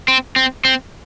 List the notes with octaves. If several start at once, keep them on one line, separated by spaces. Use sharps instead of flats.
C4
C4
C4